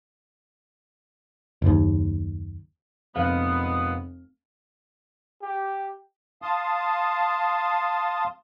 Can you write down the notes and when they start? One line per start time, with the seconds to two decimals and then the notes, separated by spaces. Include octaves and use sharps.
1.62 F#1 D#2
3.15 F1 A#2 G#3 B3 F5
5.42 G4
6.42 F5 A5 C6 D#6